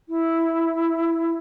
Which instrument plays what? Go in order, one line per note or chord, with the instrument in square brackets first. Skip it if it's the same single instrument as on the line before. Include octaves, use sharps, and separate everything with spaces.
[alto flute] E4